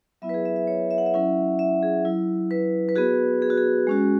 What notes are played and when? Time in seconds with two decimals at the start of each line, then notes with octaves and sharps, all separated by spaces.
0.22 F#3 B3 E4 E5
0.29 B4
0.34 G#4
0.45 E5
0.56 E5
0.67 C#5
0.91 E5
0.98 F#5
1.06 E5
1.14 F#3 C#4 E4 F#5
1.59 E5
1.83 G#4
2.05 F#3 E4
2.51 B4
2.89 B4
2.96 B3 F#4 G#4
3.42 G#4
3.50 F#4
3.58 G#4
3.87 G#3 C#4 F#4